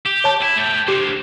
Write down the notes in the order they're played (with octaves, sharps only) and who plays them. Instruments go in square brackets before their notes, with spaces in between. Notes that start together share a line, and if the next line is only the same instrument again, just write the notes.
[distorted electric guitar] G4
[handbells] C#5 A5 G6
[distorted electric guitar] E4
A3 G5
[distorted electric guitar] D4 C5 [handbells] G4 C#7